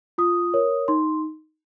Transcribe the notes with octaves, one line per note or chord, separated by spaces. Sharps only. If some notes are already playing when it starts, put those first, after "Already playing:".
F4 D#6
A#4 C#5
D#4 C6